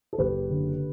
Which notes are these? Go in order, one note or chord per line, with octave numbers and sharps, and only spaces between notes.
A4
F#1 G4 B4
D3